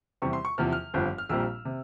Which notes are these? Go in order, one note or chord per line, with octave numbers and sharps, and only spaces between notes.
E2 C3 G3 C4 C#6
C6
C#6
E2 C3 F3 F6
F6
G1 G2 F3 C4
F6
A#1 A#2 G3 C4 E6
C3